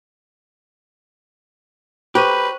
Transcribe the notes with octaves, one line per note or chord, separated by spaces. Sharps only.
G4 B4 C5 C#6 D#7